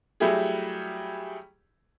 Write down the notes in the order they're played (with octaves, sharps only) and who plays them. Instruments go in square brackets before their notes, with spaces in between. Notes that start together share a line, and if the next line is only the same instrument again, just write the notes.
[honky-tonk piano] F#3 G3 A3 E4 G4 G#4